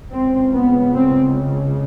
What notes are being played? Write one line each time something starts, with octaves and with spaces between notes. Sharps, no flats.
C#2 C#3 C4
B3
C4